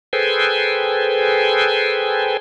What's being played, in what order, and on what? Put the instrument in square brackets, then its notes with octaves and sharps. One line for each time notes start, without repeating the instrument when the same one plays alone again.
[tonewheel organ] G#4 A4 B4 C5 G5 G#5